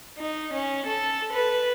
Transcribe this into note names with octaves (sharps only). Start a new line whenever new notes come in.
D#4
C#4
A4
B4